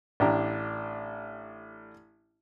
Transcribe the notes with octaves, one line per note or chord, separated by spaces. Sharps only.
A1 D4 G4 A#5